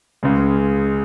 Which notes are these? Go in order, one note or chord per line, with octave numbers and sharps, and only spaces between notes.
C#2 C#3 G#3